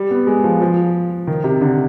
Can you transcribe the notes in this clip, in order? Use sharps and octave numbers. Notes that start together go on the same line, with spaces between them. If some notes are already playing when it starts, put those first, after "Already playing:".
Already playing: G3
B3
G#3
F3
F3
D#3
C3
D3